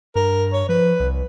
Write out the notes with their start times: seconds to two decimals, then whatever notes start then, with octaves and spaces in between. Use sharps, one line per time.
0.16 G2 A#4
0.53 C#5
0.69 F3 B4
1.00 C2